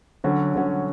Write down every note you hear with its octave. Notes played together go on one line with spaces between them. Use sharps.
D3 F#3 C#4 F#4
D3 F#3 C#4 F#4